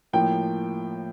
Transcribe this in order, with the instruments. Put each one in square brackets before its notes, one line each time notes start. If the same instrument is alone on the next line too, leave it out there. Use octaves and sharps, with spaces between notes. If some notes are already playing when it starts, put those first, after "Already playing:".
[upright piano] A2 F3 A#3 G5